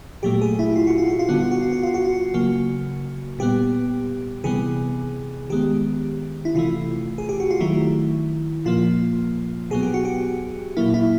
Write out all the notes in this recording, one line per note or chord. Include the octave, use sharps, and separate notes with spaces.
A#2 F#3 A3 G4
G#4
E4
F4
F#4
F4
F#4
F4
D3 G3 B3 F#4
F4
F#4
F4
F#4
F4
F#4
F4
C#3 F#3 A#3 F#4
A#2 G3 B3 G4
C3 E3 G3 B3 G#4
D#3 G#3 B3 G4
E4
C3 E3 A3 F4
G#4
G4
F#4
F4
D#3 F#3 A3 E4
A#2 F3 A#3 F4
B2 F#3 B3 G#4
G4
F#4
G4
A#2 F#3 A#3 E4
E4